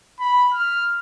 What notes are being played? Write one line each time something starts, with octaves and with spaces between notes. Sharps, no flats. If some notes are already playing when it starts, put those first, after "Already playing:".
B5
F6